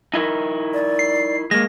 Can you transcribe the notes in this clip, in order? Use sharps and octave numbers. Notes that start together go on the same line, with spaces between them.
D#4 E4 A#4
D5
C7
G#3 A#3 A#6